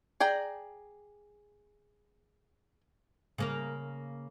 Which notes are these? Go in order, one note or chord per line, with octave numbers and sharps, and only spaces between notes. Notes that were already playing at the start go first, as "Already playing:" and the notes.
G#4 D5 G5 A#5
C#3 A#3 A#4